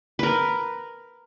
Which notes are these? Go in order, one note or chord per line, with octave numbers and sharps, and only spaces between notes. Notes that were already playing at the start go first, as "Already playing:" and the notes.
A#4 B4